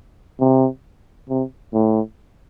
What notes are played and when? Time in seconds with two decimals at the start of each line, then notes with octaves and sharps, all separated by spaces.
0.40 C3
1.29 C3
1.73 A2